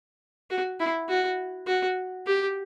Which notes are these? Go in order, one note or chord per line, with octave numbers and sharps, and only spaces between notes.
F#4
E4
F#4
F#4
G4